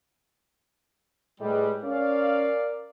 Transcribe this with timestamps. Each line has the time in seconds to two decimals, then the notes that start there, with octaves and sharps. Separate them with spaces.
1.41 A2 G3 G#3 B4
1.84 C#4 A#4 D5 F5